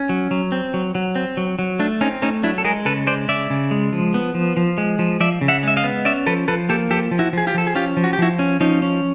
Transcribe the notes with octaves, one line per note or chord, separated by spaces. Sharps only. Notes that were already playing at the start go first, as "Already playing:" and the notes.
Already playing: C#4
F#3
F#3
C4
F#3
F#3
C4
F#3
F#3
A3 D4
C4 C#4 D#4
A3 C#4 D#4
F#3 D4 E4
A4
G#3 G#4 A#4
C#3 A4 B4
G#3 C5 D5
C#3 D5 E5
C#3
G#3
F3
B3
F3
F3
G#3
F3
F3 D5 E5
C#3
E5 F#5
G#3 E5
D#5 F5
B3
C#4 D5 E5
F3 A4 B4
F3 A4 B4
A#3 G4 A4
F3 G4 A4
F3
E4 F#4
F3 G#4
F4 G4
F3 A4
G#4
C#4 F4 G4
F3
F#4
G4
F3 E4 F#4
C#4
F3 C#4 D#4
C#4